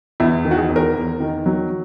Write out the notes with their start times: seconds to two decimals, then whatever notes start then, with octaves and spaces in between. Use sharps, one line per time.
0.20 E2 E4
0.45 D#3
0.51 F#4
0.57 G#4
0.70 E2
0.76 A#4
0.95 E2
1.20 D#3
1.46 F#3